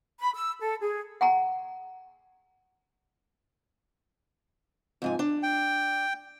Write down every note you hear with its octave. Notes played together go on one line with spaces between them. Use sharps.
B5
E6
A4
G#4
F#5 G#5 A#5
F2 G#2 G#5
D4
G5